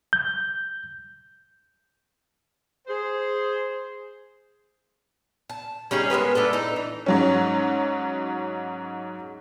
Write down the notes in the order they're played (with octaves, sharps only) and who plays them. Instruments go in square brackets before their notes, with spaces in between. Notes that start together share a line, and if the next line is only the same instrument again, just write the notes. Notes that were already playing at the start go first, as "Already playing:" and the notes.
[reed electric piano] G6
[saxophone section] G#4 C5
[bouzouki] A5
G3 C#4 D#4 G#4
G#3 B3 A#4 B4
A3 B3 D4 A4
D#4 E4
E3
[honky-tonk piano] G#2 F#3 C#4